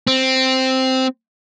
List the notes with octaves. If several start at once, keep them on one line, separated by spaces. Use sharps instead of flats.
C4